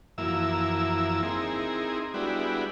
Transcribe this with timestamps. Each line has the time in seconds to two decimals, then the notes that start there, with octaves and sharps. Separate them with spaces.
0.18 F#2 E3 F3 A#3 E4 E6
1.23 C4 D#4 E4 G#4 A#4
2.14 G3 G#3 B3 D4 E4 F#4